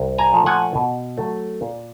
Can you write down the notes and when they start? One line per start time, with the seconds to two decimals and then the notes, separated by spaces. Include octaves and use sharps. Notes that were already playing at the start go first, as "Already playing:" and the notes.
Already playing: C2
0.18 G#5 A#5
0.32 A#2 F3 A3
0.46 F#5 G#5
0.75 B2
1.17 F#3 A3
1.61 A#2